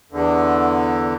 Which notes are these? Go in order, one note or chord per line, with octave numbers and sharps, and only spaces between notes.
E2 D3